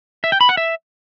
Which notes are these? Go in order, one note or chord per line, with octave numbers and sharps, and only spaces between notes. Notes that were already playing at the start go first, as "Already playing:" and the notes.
E5
G5
B5
F#5
E5